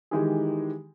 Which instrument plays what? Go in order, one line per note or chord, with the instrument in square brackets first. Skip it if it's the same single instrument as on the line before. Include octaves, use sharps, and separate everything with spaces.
[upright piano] D#3 E3 G#3 D#4 G4 G#4